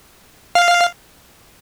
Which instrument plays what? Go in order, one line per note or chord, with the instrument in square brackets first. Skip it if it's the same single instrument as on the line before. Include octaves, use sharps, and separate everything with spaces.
[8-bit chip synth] F5